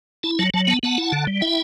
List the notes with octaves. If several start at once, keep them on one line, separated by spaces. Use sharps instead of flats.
E4 A5
F#3 A5
F#3 A5
B3 A5
B3 F#5 A5
E4
D3
G3
E4 E5 G5